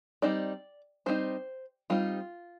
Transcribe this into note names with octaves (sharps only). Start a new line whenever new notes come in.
G3 C4 D#4 D5
G3 C4 D#4 C5
G3 C4 D#4 F4